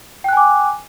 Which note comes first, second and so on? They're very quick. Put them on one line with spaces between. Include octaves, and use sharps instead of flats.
G5 F#6 G#5 D6